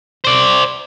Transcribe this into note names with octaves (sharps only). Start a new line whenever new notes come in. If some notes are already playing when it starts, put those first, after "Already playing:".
C5 D5